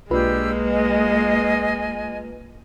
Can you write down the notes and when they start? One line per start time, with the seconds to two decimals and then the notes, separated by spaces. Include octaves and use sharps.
0.10 B1 G#3 A#3 D4 F4 G4 B4 E6
0.72 D#5 G#5